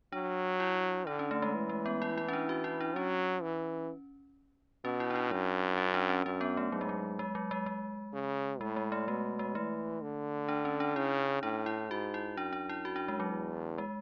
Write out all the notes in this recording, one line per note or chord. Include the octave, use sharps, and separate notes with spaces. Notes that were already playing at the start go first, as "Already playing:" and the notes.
F#3 D4
E4
D3 D4
C#4
A3
G#3
E3
G#3
B3
E4
E4
C#4
D4
F#4
E4
D4
F#3 C#4
E3
B2 C#4
E4
D4
E4
F#2 D4
C#4
D4
C#4
F#2 C#4
B3
A3
G#2 F#3
G#3
F#3
G#3
F#3
G#3
G#3
C#3
A2 G#3
G#3
A3
B2 G#3
G#3
E3 A3
D3
D4
C#4
D4
C#3 E4
A2 D4
E4
G#2 F#4
E4
F#2 D4
D4
E4
F#4
D4
G#3
F#3
E2
G#3